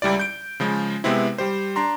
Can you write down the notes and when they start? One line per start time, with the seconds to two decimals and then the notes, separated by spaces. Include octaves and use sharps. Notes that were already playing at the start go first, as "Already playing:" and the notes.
0.02 C#2 G3 E4 D5
0.19 G6 D7
0.60 C#3 F3 G#3
1.04 C3 G#3 B3 C4 E4
1.38 G3 G4 C5
1.76 D4 A#5 C6